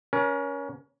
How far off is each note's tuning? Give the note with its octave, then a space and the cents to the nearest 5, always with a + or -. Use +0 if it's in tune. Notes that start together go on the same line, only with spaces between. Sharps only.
C#4 +20 A#4 +35